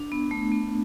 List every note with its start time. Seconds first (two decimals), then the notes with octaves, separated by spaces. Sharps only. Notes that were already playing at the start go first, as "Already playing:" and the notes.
Already playing: D4
0.12 B3
0.31 A3
0.52 B3